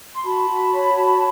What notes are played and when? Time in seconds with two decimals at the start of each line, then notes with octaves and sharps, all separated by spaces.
0.15 C6
0.25 F#4 A5 B5
0.49 F#4
0.72 C#5
0.95 F#4